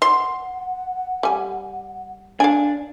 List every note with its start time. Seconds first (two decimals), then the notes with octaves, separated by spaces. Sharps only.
0.02 F#5 C6
1.23 G3 G#5
2.40 D4 F5 G#5